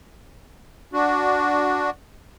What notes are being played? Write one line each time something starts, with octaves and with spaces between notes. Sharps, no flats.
D4 F#4